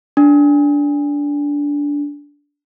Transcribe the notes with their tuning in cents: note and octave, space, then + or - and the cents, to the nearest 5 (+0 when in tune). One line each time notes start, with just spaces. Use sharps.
D4 -20